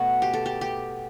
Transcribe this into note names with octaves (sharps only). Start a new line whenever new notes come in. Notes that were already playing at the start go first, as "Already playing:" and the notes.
Already playing: B2 A3 F#4
G4
A4
G4
G4